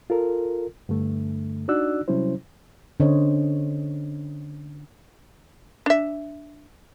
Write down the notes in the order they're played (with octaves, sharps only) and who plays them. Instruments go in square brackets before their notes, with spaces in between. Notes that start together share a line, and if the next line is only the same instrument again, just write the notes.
[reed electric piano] F4 A4 A#4
G2 D3 A3
D4 D#4 F#4 D5 E6 F#6
C3 F#3 G3 C#4 E4 C5
[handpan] D3 C#4 C5 C#5 D#5
[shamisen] D4 E5